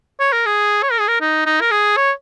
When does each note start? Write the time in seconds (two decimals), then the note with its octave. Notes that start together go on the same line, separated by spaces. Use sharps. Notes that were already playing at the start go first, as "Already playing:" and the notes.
0.20 C#5
0.32 A#4
0.46 G#4
0.83 C#5
0.91 A#4
1.00 G#4
1.08 A#4
1.21 D#4
1.46 D#4
1.61 A#4
1.71 G#4
1.97 C#5